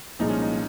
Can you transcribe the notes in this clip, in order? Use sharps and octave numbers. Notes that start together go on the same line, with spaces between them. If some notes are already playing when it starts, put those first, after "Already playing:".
C2 A#2 F3 G#3 D#4
C#4
D#4